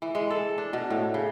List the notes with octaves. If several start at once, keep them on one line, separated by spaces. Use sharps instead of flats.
E3
G#3
A4
D4
B2
A2
C#3